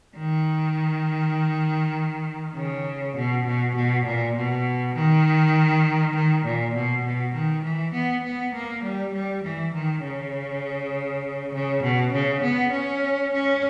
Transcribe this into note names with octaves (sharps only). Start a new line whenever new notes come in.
D#3
C#3
B2
B2
B2
A#2
B2
D#3
D#3
A#2
B2
B2
D#3
E3
B3
B3
A#3
G3
G3
E3
D#3
C#3
C#3
B2
C#3
B3
C#4
C#4